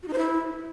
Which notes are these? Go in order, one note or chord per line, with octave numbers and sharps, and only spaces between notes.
F#4
D#4
C5
E4